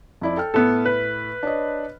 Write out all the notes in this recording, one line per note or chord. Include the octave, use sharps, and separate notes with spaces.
F2 E4 D5
A4 G5 F6
A2 B3 A4
B4
D4 C#5 D#5